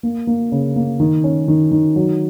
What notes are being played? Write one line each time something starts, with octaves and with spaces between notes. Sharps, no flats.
A#3
A#3
C#3
A#3
D#3
C#4
D#3
D#3
F#3